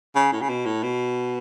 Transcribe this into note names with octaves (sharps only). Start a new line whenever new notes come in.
C#3
A2
C#3
B2
A2
B2